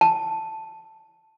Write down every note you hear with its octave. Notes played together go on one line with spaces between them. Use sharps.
A5